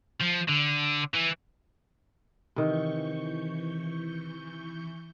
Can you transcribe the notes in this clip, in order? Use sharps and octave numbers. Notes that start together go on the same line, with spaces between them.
F3
D3
E3
C3 D#3 E3 C#6 G6